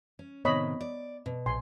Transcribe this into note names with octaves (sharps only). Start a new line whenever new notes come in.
C#4
A2 C3 D#3 B3 C#5 D#5 B5
D5
B2
A#1 G#5 C6